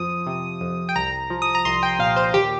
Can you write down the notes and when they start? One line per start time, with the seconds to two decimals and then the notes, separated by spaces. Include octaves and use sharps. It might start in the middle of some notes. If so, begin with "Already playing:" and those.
Already playing: F2 F3 D#6
0.27 C3
0.61 F2
0.89 G5
0.96 C2 A#5
1.30 F3
1.42 D#6
1.55 A#5
1.65 C2 C6
1.83 G5
1.99 A#2 F5
2.16 C5
2.34 D#2 G4